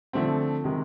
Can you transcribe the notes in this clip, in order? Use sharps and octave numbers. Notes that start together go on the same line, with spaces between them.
D3 F3 A3 C4
C3 D#3 G#3